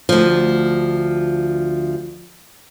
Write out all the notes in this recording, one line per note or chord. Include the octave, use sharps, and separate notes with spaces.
D2 F3